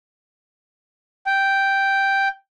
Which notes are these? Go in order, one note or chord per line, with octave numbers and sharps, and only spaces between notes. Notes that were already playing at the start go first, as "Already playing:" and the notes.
G5